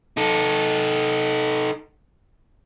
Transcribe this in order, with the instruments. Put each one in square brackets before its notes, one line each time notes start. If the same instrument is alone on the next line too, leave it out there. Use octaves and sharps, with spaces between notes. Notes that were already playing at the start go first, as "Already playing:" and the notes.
[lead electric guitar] D#4 A4